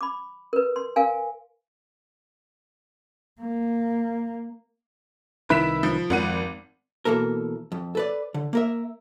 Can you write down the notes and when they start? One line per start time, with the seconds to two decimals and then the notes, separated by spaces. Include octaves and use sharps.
0.01 B5 D6
0.53 A#4 B4
0.76 C6
0.96 A#4 F5 G#5
3.41 A#3
5.50 C2 D#3 E4 B4 B6 E7
5.83 F3
6.10 G#1 F2 F#5 D#7
7.05 B2 E3 A#3 A4 A#4
7.72 F2
7.95 A4 B4 D5
8.34 D3
8.53 A#3 A#4 E5